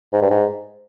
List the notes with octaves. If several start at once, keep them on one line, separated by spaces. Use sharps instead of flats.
G#2
G2
G#2